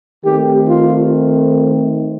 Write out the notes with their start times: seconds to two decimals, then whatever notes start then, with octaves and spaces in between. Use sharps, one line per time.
0.24 D#3 A3 C4 G4
0.67 F4